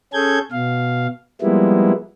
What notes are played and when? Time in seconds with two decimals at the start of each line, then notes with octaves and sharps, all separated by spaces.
0.13 C#4 G#4 A4 G6 G#6
0.52 B2 F5
1.42 F3 G3 G#3 A#3 B3 E4